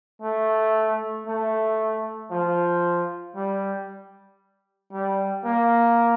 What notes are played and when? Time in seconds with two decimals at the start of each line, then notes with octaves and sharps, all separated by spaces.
0.22 A3
1.27 A3
2.31 F3
3.36 G3
4.93 G3
5.45 A#3